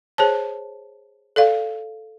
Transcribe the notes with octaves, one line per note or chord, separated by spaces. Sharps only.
G#4 C5 C#5 A5
A4 D5 F5